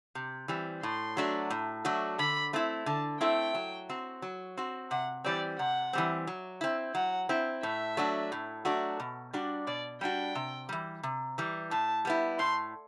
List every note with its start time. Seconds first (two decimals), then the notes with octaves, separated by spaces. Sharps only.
0.15 C3
0.48 E3 G3 C4
0.83 A2 C6
1.17 F#3 A3 D4 F#4
1.50 A2
1.85 F#3 A3 D4 F#4
2.19 D3 B5
2.53 A3 C4 E4
2.86 D3 A5
3.21 A3 C4 E4 G5
3.55 F#3
3.89 C4 F#4
4.22 F#3
4.57 C4 F#4
4.91 C3 F#5
5.24 E3 G3 C4 D5
5.58 C3 F#5
5.93 E3 G3 C4
6.27 F#3
6.61 C4 E4
6.95 F#3 F#5
7.29 C4 E4
7.63 A2 E5
7.97 F#3 A3 D4 F#4
8.32 A2
8.65 F#3 A3 D4 F#4
9.00 B2
9.33 G3 D4 F#4
9.67 B2 D5
10.01 G3 D4 F#4 G5
10.35 C3
10.69 E3 G3
11.03 C3
11.38 E3 G3
11.71 A2 A5
12.05 G3 B3 E4
12.39 A2 C6